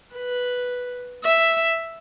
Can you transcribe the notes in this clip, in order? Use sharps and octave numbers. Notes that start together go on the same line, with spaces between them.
B4
E5